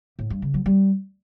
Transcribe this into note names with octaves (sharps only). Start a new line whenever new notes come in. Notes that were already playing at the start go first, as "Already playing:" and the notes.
A2
G2
C#3
F#3
G3